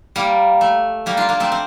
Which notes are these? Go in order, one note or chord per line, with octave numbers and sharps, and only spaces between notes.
G3 A#3
A3
G3 A#3
D4 F4
A#3 D4
A3 C4
C4